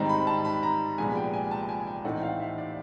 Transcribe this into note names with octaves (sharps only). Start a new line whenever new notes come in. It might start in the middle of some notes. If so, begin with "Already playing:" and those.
Already playing: G#2 D#3 G3 C4 D#4 A#5
B5
A5
B5
A#5
C2 A#2 F3 G#3 B3 G#5
G5
G#5
A5
G#5
G5
A2 E3 A3 C4 D#4 F#5
F5
E5
D5